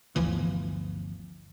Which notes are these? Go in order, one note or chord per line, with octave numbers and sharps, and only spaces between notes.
G1 D2 E3 F3